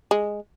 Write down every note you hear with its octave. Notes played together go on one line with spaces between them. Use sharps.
G#3